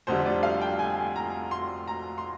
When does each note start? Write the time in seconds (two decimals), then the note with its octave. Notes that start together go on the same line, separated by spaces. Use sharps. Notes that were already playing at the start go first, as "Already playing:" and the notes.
0.07 F1 F2 D3 G3 C5
0.26 D5
0.43 F5
0.61 G5
0.79 G#5
1.16 A#5
1.51 C6
1.88 A#5
2.18 C6